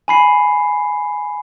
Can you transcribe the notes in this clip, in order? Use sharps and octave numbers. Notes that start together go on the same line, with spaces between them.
G#5 B5 C7